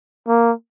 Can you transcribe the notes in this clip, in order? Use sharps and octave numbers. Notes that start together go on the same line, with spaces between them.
A#3